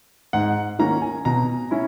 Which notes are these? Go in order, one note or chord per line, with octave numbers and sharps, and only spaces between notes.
G#2 F#5
D#3 A#3 C#4 A#5
G#5
B2 A#5
C#4 E4